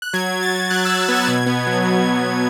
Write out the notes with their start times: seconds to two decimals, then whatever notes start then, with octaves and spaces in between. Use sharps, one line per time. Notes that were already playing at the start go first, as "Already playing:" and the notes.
0.02 F#6
0.14 F#3 G#6
0.33 F#3
0.43 A6
0.51 F#3
0.71 F#3 F#6
0.85 F#3 E6
1.09 B3
1.14 G#6
1.28 B2 G#6
1.46 B3
1.67 F#3
1.85 B2
2.05 F#3
2.23 B2